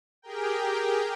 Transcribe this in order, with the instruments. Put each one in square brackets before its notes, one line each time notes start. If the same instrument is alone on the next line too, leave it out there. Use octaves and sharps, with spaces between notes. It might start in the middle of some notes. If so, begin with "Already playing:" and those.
[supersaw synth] G4 G#4 A#4 G5